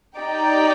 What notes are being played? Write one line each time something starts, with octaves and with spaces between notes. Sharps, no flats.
D#4 G4 D5 G5